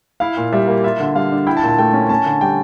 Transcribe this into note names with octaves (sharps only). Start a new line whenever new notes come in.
E4 F5
A#2
G3 E5
A#3
F4 E5
D3
G3 F5
D4
E4 G5
A5
A#2
A5
A3 G5
C#4
C#4 A5
D3
G3 G5